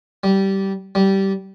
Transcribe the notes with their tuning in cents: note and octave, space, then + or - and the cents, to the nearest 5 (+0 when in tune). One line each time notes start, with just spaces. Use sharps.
G3 -15
G3 -15